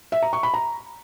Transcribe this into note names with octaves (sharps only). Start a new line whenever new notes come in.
E5
A#5
C#6
B5
A#5